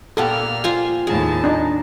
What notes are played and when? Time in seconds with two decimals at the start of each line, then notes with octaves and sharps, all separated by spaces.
0.17 A#2 A#3 B3 G4 A4 E6 F6
0.64 F4 C5 G#5
1.07 D#2 A2 G#4 A5
1.44 D4 D#4